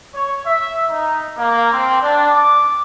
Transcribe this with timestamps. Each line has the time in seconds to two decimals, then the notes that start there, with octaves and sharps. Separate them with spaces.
0.14 C#5
0.46 E5
0.90 D#4
1.37 A#3
1.72 C4
2.00 D4
2.30 D6